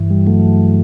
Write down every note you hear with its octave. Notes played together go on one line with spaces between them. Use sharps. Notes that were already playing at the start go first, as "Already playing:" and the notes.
Already playing: G2 E3
G3
F#3 A3